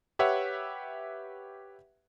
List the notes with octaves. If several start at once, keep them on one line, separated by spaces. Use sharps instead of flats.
G4 B4 C#5 E5 F#5